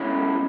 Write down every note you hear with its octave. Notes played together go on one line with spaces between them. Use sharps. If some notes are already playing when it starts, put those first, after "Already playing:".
Already playing: B2 G#3 C#4 E4